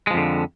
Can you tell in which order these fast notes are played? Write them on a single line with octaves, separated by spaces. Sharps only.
G#3 F3 F2 D3